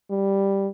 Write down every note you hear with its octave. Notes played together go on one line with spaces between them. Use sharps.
G3